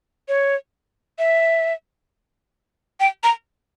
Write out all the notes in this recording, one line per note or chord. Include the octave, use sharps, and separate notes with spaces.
C#5
E5
G5
A#5